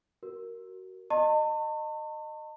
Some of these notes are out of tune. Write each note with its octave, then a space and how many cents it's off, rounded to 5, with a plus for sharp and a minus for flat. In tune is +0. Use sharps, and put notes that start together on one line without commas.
F#4 +20 A#4 +0
D#5 -20 A5 +45 C6 +45